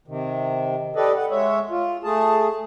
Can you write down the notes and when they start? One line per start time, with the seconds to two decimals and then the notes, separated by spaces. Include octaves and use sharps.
0.08 C3 D#3
0.96 G4 A4 B4 D5 D#5
1.17 F#5
1.31 G#3 C#5 E5
1.70 F4
2.04 A3 G#4 A5